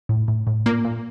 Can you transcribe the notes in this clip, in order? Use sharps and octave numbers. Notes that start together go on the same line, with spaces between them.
A2
A2
A2
A#2 A#3
A#2